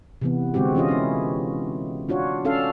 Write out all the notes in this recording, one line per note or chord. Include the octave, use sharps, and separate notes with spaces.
C3 E3 B3
D3 G#3 C4 F#4 G4
E3 C#4 F4 D#5
C#4 E4
D4 F4 F#4 C#5
C#4 D4 A4 F5